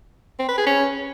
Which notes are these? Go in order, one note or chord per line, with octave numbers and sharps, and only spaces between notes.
C4
B4
G#4
C#4